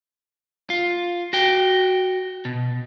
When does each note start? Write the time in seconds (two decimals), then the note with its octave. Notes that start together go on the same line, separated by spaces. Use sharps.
0.70 F4
1.33 F#4 G5
2.45 B2